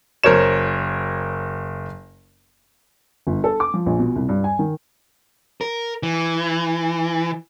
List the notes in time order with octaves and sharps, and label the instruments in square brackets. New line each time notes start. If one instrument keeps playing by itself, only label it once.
[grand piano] F#1 A#4 C5 C#5 E7
[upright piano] G1
A4
D6
F3
A#1
B2
C2
G2
G#5
D#3
[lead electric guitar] A#4
E3